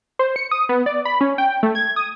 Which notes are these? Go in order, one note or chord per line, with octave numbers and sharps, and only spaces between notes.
C5
C#7
D#6
B3
D5
B5
C#4
G5
A3
G#6
D#6